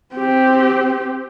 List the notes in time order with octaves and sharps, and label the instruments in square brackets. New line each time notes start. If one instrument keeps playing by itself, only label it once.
[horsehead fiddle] C4 G4